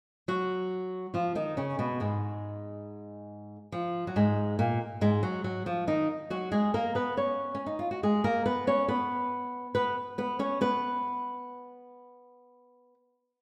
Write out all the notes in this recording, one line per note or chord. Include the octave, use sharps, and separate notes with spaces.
F#3 F#4
F3 F4
D#3 D#4
C#3 C#4
B2 B3
G#2 G#3
F3
F#3
G#2 G#3
A#2 A#3
G#2 G#3
F#3
F#3
F3
D#3 D#4
F#3 F#4
G#3 G#4
A#3 A#4
B3 B4
C#4 C#5
C#4
D#4
F4
F#4
G#3 G#4
A#3 A#4
B3 B4
C#4 C#5
B3 B4
B3 B4
B3 B4
C#4 C#5
B3 B4